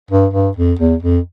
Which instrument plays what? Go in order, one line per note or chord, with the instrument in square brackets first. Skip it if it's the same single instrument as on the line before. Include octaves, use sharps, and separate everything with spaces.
[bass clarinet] G2
G2
F2
E2
F2